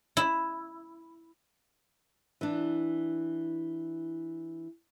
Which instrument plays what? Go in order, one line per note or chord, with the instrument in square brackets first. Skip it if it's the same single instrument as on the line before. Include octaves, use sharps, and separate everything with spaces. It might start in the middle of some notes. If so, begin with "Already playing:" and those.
[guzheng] E4
[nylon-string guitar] E3 D4